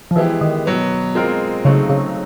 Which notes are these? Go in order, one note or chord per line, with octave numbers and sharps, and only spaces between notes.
F3
E3 G#3 B3 E4 G4
D#3
B2 F#3 B3
B2 G#3 C4 F4 A#4
C#3 F#3 A3 C4 D#4
C#3